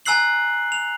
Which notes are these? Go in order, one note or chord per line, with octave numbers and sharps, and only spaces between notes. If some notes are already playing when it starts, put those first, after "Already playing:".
G#5 A#5 E6 F#6 C7 F#7
F7